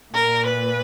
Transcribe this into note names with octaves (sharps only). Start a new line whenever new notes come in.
A#2 A#4
B4